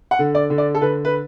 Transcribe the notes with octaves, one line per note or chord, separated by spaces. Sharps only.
F#5
D3
D5
D3
D5
A4
D3 B4
B4